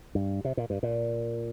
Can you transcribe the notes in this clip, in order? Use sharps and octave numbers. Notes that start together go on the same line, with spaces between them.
G2
C3
A#2
G2
A#2